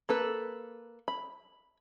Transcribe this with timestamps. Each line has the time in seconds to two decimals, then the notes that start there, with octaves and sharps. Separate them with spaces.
0.09 A#3 A4 B4
1.08 B5